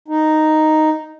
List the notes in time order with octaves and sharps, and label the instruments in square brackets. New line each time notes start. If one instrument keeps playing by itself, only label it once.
[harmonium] D#4